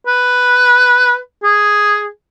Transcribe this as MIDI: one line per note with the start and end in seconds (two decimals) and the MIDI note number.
0.07 1.17 71
1.43 2.07 68